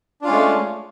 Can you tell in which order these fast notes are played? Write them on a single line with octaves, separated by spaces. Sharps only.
D4 F4 C#4 G#3 A3